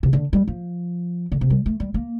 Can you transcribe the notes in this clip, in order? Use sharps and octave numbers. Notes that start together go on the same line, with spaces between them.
C3
D3
G3
F3
D3
C3
G3
A3
G3
A#3